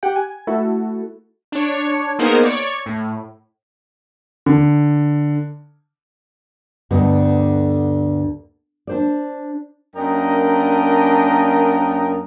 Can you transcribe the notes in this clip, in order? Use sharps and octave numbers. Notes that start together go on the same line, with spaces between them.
G4 F#5 G5
G#5
A3 E4 F#4 A4
D4 C#5
A#3 B3 D#4 G#4 A#4 C5
C#5 D5 C#6
A2
D3
D2 G2 D3 A3 B3 D#5
D4 C5 D5
F#2 A#3 D4 A#4 D#5 G5